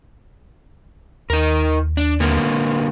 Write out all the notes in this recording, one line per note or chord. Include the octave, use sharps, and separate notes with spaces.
D#2 D#4 A#4
D4
D3 A#3 B3